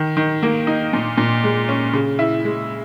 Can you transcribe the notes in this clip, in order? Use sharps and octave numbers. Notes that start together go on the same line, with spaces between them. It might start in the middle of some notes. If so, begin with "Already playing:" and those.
Already playing: D#3
D#3
A#3
D#4
A#2
A#2
G#3
C#4
C#3
E4
G#3